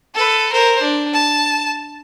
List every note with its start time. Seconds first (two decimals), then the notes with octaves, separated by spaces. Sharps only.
0.14 A4 B4
0.52 A#4 C5
0.82 D4
1.14 A5